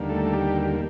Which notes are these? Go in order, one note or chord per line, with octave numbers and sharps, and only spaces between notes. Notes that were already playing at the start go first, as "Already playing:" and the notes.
Already playing: D#2 D3 G3 A#3
A3 A4
G4